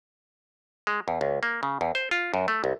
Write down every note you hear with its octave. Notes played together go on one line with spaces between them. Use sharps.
G#3
E2
C#2
A#3
C#3
E2
C5
F4
F#2
A3
C2